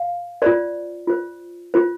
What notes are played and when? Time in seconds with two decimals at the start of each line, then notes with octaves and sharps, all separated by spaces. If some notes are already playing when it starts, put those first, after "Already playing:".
Already playing: F5
0.42 F4 C5 D5
1.08 F4 C5
1.74 F4 C5